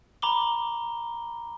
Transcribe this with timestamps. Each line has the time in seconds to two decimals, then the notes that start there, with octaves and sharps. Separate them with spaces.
0.22 A#5 B5 D6 G7